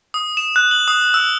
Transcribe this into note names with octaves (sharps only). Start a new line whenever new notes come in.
D#6
E7
F#6
F#7
D#6
E6